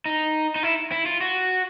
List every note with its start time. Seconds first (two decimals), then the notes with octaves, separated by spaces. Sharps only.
0.06 D#4
0.56 D#4
0.63 E4
0.92 E4
1.06 F4
1.21 F#4